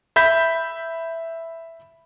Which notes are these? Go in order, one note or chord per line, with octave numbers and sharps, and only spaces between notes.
E5 B5 G6 B6